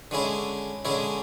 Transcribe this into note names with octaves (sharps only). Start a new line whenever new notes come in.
D3 G#3 C#4 E4
D3 G#3 C#4 E4